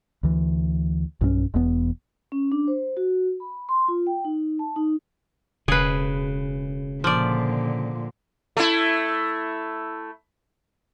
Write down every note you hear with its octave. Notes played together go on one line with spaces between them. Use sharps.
D2 E3
B1 G2 C4 C#4
E1 E2 B3
C#4
D4
C5
F#4
B5
C6
F4
G5
D#4
A5
D#4
E1 C#3 G#4 B4
A#2 D3 F3 D5
A3 E4